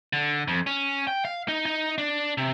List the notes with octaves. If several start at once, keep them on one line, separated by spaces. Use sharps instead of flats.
D3
F2
C#4
G5
F5
D#4
D#4
D4
C3